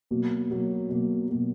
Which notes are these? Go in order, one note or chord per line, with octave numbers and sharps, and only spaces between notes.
B2 F#3 A#3
B2 F#3 A#3
B2 F#3 A#3
B2 F#3 A#3